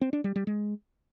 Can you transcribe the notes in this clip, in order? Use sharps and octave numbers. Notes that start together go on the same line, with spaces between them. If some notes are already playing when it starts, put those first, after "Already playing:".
C4
D4
G3
G3
G#3